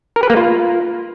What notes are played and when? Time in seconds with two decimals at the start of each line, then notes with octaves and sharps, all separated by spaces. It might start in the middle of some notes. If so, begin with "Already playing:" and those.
0.16 A#4
0.23 B4
0.30 A#3
0.37 F4